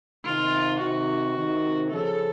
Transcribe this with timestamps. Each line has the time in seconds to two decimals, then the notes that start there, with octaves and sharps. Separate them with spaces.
0.25 C3 D#3 F4
0.80 C3 D#3 F#4
1.36 C3 D#3
1.91 C#3 F3 A4